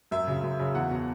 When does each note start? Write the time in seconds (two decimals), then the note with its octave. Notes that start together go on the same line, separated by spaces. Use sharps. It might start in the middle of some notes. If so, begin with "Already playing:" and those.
0.11 F#2 E5
0.27 C#3 F#3
0.43 F#2
0.59 C#3 F#3
0.75 E2 F#5
0.91 B2 F#3